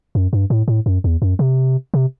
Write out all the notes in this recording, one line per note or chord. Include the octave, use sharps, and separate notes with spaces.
F#2
G2
A2
A2
F#2
E2
F#2
C3
C3